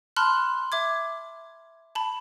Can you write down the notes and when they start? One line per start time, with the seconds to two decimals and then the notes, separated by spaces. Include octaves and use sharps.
0.16 A5 B5 C6 F6 F#6
0.72 E5 D6 G#6
1.95 A5 B5